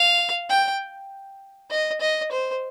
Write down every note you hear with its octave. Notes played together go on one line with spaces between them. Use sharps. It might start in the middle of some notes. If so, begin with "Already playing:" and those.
Already playing: F5
G5
D#5
D#5
C5